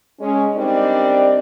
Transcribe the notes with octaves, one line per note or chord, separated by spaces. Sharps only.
G#3 C#4
G3 C4 D4 D#4 A#4 D5